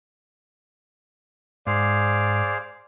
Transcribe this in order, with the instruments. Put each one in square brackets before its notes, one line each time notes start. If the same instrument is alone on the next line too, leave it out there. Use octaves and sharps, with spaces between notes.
[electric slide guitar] G#2 [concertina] G#4 C5 F5 [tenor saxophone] D5